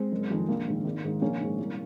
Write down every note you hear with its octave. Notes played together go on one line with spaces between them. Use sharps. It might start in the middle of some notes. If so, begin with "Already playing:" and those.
Already playing: G#3 C4
F#1
F2 D#3
A#1 A#3
G#2 D#3
G#1
G#2 D#3
A#1 A#3 C#4
G#2 D#3
C2